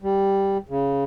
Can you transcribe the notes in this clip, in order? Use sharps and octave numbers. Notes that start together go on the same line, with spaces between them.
G3
C#3